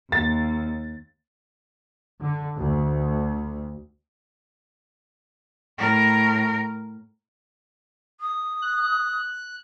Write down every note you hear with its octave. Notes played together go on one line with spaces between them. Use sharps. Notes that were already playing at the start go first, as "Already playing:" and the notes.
D#2 A6
D3
D2
A2 A#4
D#6
F#6